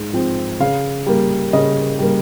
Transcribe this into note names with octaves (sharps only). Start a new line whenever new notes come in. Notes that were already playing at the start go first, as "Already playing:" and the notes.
Already playing: G#2
F3 C4
C#3 F5
G3 A#3
C#3 D#5
G3 A#3